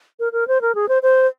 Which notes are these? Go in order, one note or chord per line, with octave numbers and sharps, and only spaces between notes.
A#4
A#4
C5
A#4
G#4
C5
C5